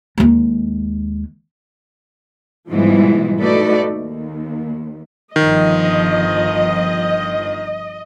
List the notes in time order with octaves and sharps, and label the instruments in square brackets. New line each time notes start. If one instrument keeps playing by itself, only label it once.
[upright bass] D#2 G#3
[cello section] G#2 B2 E3 F3 G3 G#3
A3 D#4 F#4 A4 B4 D5
D#2
[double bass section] G1 F3 [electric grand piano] D#3 [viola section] D#5